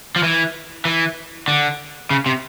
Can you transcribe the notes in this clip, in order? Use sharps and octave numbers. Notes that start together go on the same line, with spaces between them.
F3
E3
E3
D3
C#3
C3